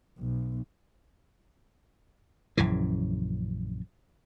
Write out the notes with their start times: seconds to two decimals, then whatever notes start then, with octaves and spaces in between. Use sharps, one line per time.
0.19 B1
2.57 A#1 F#2 C#3 E3